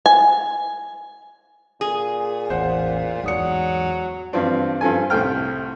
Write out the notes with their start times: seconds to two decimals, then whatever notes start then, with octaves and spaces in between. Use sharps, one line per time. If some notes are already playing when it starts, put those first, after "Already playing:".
0.06 G#5
1.81 A#2 G#4
2.50 A1 E2 C5 F#5
3.24 E2 G#2 F#3 D5 D#6 C#7
4.33 G2 E3 F3 C4 D4
4.81 G2 F3 A4 G#5
5.10 C2 A2 A3 G5 F6